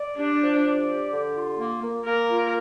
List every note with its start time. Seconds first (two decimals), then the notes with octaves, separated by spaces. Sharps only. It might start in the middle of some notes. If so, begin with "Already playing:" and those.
Already playing: D5
0.17 D4 G4
0.41 F3
0.64 D5
0.88 G4
1.11 D3
1.35 F4
1.59 A#3
1.82 A#3
2.05 A#3 A#4
2.29 F4